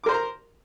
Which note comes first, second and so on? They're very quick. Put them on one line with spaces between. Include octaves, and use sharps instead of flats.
D6 A#4 C5 C6 A#5